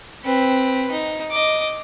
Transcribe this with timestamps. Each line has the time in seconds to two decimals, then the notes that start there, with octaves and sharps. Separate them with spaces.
0.25 C4 B4
0.91 D#4
1.30 D#5 D6